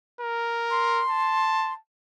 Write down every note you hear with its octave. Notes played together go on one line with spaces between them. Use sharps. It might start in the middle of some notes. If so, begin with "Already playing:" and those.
A#4
C6
A5